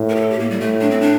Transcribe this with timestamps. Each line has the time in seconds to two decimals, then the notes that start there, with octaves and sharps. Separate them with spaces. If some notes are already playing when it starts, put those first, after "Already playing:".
Already playing: A2
0.09 A#4
0.16 G4
0.20 A4
0.30 G4
0.40 A#3
0.50 G3
0.60 A2 A3
0.81 D4
0.91 C4
1.01 D4